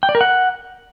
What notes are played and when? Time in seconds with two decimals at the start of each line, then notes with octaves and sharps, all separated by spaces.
0.03 G5
0.09 D5
0.15 A#4
0.21 F#5